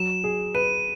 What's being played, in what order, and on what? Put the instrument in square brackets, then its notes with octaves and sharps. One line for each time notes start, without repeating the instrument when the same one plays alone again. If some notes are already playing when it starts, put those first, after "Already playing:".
Already playing: [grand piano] F#3 [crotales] E7
[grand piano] G#4
[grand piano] B4 [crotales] D#7